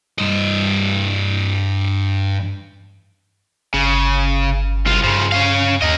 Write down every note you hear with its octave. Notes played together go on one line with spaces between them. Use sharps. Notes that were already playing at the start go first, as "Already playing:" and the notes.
G2 D#5
G1 C#3
C2 F4
G2 C#3 F3
C#4 F5
D#2 A#3 D#5